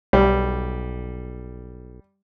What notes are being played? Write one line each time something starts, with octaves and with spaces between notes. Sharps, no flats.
B1 G3